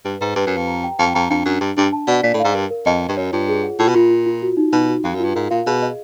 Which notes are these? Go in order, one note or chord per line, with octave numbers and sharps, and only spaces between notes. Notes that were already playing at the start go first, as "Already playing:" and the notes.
G2 B4
G#2 B4
G2 B4
F#2
G4
F2
A#5
G5
F2 G5
F2 A#5
F2 D4
F#2 D4
G2 D4
G2 D4
A5
B2 D5
A#2 D5
A2
G#2 F5
G2 A#4
A#4
F2 D#5
D#5
G2
F#2 C#5
G2 F4
G#4
F#5
A2 F4
B2
A#2 F4
F4
F4
F#4
D#4
B2 D#4
F#4
F2 F5
F#2
G2 F4
G#2 A#4
A#2 F5
B2 G#4
D#5